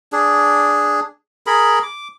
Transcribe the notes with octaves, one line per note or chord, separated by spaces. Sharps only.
D4 G#4
G#4 A#4 B5
D6